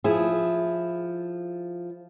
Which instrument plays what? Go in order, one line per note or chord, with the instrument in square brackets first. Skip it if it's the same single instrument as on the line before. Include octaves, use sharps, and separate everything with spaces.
[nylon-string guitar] F3 E4 G#4